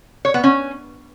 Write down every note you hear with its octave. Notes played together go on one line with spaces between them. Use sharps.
C#5
B3
C#4